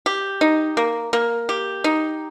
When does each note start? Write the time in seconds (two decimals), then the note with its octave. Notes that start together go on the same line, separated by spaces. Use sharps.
0.06 G4
0.41 D#4
0.77 A#3
1.13 A#3
1.49 G4
1.84 D#4